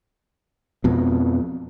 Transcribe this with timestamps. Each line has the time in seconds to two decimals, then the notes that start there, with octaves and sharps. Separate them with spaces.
0.84 F2 B2